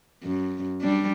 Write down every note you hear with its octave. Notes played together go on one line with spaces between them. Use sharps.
F#2
G3 D4